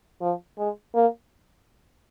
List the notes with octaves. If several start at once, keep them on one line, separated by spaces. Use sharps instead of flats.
F3
G#3
A#3